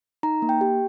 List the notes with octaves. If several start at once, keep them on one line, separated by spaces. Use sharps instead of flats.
D#4 A#5
A#3
G5
G4